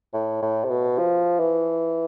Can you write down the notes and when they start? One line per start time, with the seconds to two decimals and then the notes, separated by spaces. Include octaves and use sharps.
0.13 A2
0.42 A2
0.64 C3
0.70 B2
0.98 F3
1.39 E3